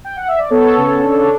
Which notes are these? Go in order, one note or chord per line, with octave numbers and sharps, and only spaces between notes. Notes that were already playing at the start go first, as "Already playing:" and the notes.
G5
F#5
E5
D5
B3 A4 C#5
C#3
D4
C#5